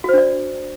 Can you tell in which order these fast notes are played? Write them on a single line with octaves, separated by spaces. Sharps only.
F#4 C5 D4 D5